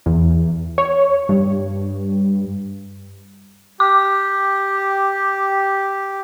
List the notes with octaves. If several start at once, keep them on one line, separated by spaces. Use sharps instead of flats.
E2
C#5
G2
G4 D6